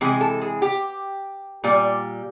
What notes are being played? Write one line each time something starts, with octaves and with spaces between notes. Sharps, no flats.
C3 E3 G#3 G#4
A4
G#4
G4
A#2 G3